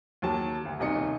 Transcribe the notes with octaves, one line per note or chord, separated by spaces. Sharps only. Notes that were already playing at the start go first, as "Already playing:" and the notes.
D#2 F#3 A5
D2
D#1 C2 D#4 D#5 C#7